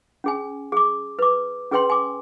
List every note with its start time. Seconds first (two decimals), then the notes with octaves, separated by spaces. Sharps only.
0.24 C#4 G#4 G#5
0.72 G#4 D6
1.19 B4 D6
1.71 C#4 G#4 B4 C#5 G5 C6
1.90 G#5 D6